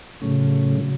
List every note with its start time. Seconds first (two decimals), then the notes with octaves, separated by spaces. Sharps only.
0.22 A2 C#3 F#3 A3 C#4
0.80 C#3 F#3